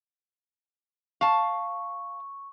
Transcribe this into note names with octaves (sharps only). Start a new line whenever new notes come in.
F5 A5 C#6